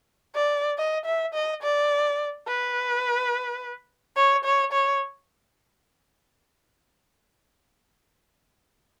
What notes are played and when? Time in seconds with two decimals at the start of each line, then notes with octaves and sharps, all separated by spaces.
0.35 D5
0.78 D#5
1.05 E5
1.34 D#5
1.63 D5
2.47 B4
4.16 C#5
4.45 C#5
4.72 C#5